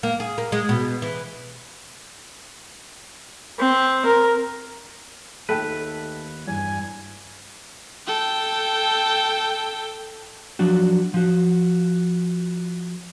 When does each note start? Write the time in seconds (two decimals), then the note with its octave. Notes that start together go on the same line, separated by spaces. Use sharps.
0.03 A#3
0.20 G#4
0.38 A#3
0.52 G#3
0.69 B2
1.02 E3
3.59 C4
4.06 A#4
5.49 D#2 A3 A4 B4 G5
6.48 E2 G2 G#5
8.07 A4 G5
10.59 F3 F#3 D4 F#4
11.14 F3 F#4